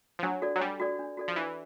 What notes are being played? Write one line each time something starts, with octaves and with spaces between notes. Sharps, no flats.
F3
F#3 D4
F#4 A4 D5
F#3
G3 D4
F#4 A4 D5
D4
F#4 A4 D5
F3
E3 D4